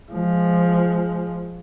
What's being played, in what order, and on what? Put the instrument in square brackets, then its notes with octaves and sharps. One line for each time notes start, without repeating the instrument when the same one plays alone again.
[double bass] F3 G#3